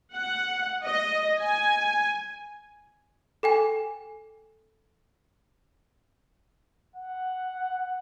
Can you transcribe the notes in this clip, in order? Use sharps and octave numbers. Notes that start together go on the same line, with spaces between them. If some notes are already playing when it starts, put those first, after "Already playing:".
F#5
D#5
G#5
A4 G5 G#5
F#5